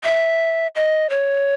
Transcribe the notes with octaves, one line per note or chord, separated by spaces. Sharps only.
E5
D#5
C#5